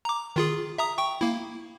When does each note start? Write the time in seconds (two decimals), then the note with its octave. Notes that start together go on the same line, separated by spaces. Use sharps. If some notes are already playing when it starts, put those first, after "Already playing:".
0.05 A#5 D6
0.36 D#3 F4 G#4
0.78 E5 A#5 D#6
0.98 G5 C#6
1.21 A#3 E4